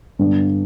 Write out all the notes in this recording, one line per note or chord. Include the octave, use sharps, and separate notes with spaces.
G2 D3 G3 B3 D4